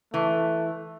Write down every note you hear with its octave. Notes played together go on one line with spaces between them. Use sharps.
E3 A3